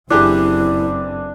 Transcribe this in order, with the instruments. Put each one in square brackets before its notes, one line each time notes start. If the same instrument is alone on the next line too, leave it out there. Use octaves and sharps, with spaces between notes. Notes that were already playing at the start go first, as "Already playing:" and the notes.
[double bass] F#1 C4 [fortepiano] E3 G4 G#4 [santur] D4 [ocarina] E4